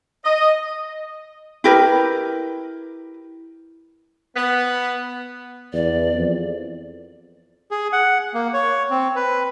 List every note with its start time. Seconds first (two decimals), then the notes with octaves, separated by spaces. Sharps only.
0.25 D#5
1.64 E4 G4 A#4 B4
4.36 B3
5.73 E2 D5
6.15 F2
7.71 G#4
7.93 F#5
8.34 A#3
8.54 C#5
8.90 C4
9.16 B4